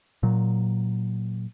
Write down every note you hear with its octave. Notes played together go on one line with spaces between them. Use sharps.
A#2 F#3